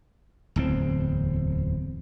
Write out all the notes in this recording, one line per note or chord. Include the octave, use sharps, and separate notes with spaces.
D1 E2 C4